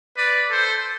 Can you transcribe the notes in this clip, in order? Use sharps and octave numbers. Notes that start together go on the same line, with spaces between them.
B4 D5
A4 C5